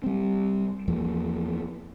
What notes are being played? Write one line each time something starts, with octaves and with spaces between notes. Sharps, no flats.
G3 C4
E2 F3 A#3